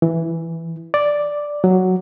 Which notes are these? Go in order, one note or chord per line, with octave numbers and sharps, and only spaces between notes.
E3
D5
F#3